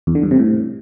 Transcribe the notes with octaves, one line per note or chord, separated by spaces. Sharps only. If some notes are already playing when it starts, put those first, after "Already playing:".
E2
D3
G2
C3
A2